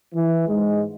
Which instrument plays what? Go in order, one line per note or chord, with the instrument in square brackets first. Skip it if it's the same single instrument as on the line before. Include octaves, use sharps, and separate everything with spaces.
[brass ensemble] E3
G#2 G#3